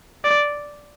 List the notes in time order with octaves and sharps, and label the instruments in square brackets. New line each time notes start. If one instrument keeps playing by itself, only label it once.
[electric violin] D5